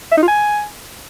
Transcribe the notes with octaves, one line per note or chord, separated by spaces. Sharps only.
E5
D#4
F4
G#5